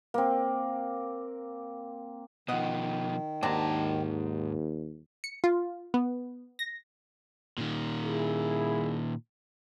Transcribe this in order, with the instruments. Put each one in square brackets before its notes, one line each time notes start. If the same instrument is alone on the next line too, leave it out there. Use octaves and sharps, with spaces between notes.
[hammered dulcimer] A#3 C4
[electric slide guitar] B2 F3 [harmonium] D#3 [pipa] D#5 F#5
[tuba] D#2 [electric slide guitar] G#2 A5 [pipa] F#3 C4 D4
[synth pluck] C#7
F4
B3
A#6
[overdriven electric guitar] A#2 D#3
[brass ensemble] E4 G#4